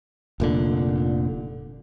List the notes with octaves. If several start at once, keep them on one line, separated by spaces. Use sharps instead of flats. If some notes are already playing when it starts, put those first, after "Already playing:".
F1 A#2 D3